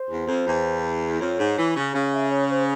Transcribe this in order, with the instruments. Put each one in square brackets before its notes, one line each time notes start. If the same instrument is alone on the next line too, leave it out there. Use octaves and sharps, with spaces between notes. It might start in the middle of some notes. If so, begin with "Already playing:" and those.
Already playing: [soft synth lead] C5
[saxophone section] E2
F2
E2
[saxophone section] F2 [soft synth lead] C#5
[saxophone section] G#2
E3
C#3
[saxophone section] C#3 [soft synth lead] F5
[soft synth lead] E5
C#5
C5